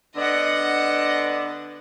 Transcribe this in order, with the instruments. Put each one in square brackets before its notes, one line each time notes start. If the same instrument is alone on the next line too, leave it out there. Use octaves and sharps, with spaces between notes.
[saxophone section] D3 B3 D4 [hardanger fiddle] D#5 F#5